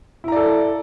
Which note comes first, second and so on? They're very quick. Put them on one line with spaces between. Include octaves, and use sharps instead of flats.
E4 A#5 D5 A4